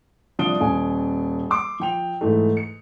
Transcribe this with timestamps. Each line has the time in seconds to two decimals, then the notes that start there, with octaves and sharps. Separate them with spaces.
0.39 C2 F3 D4 D#6 D7 G7
0.61 D#1 G#5
1.50 C6 D6 E6
1.80 F3 G5 F7
2.21 G#2 E3 A3
2.57 C#7